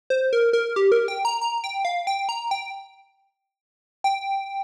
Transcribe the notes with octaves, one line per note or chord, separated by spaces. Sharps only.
C5
A#4
A#4
G4
A#4
G5
A#5
A#5
G5
F5
G5
A#5
G5
G5